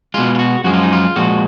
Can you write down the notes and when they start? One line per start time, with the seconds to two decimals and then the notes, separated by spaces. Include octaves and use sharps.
0.14 B2 G#3 F4
0.35 F4
0.39 F#4
0.64 F#2 F3 G#3 F#4
0.74 F4
0.83 D#4
0.93 F4
1.16 A#2 F3 G#3 F#4